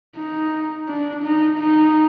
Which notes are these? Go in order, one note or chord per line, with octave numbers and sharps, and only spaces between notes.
D#4
D4
D#4
D#4